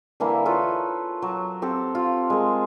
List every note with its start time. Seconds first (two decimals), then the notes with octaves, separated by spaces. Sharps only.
0.20 D3 E3 A#3 E4
0.45 F4 A4 B4 C#5
1.22 F#3
1.62 C4 G4 A4
1.95 F4
2.30 G#3 A#4